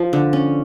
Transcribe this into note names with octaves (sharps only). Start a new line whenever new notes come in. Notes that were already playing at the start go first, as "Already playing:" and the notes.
Already playing: F3
D3
C#4